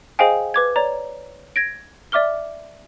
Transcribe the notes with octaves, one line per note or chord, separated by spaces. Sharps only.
G#4 C5 D#5 F5 G5 G#5
B4 D6 G#6
C#5 D5 A#5
G#6 A#6 D7
D5 E5 D6 F6 G7